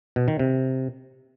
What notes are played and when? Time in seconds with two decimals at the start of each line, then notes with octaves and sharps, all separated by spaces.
0.16 B2
0.28 D#3
0.39 C3